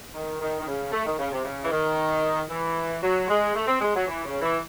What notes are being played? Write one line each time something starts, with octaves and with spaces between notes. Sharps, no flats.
D#3
D#3
D#3
C#3
A3
D#3
C#3
C3
C#3
E3
D#3
E3
F#3
G#3
A3
C4
G#3
F#3
E3
C#3
E3